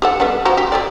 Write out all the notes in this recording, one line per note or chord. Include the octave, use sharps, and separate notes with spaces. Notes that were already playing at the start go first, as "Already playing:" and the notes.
G4 A4 F#5
G3 B3 D4
F3 F#4 A#5
G4
G4 A4 D5